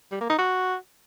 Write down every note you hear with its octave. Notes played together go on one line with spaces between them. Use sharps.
G3
A#3
D#4
F#4